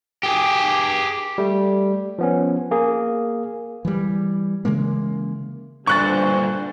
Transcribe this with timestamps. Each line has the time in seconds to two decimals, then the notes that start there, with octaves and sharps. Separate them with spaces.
0.23 G4 G#4
1.38 G3 A3
2.18 F3 B3 C#4
2.71 A#3 G#4
3.85 E3 G3
4.65 C#3 E3 G#3 A#3
5.87 G2 A#2 D3 C5 C#6 F#6 A6